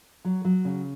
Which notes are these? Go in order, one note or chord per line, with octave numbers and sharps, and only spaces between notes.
F#3
F#3
C#3